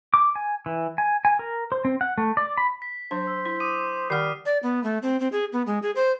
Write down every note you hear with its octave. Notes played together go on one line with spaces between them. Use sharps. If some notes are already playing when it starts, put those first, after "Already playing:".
D6
G#5
E3
G#5
G#5
A#4
C5
C4
F#5
A3
D5
B5
B6
F#3 D4 C5
E6
E4
D6 D#6 D#7
D#3 G3 F#5 F6 C7
D5
B3
A3
C4
C4
G#4
B3
G#3
G#4
C5